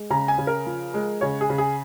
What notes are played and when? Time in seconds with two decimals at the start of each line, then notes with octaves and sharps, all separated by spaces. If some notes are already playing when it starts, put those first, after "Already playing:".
Already playing: G#3
0.10 C#3 A#5
0.28 G#5
0.38 C#3
0.47 A#4
0.66 F3
0.94 G#3
1.21 C#3 C#5
1.41 G#4
1.50 C#3
1.58 G#4